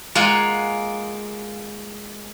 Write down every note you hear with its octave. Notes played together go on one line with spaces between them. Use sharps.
G#3 A#3 F4 F5 F#5 G#5